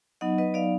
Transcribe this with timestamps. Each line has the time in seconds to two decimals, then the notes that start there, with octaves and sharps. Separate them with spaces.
0.21 F#3 B3 D#4 D#5 F#5
0.38 B4 D#5
0.54 D5 F5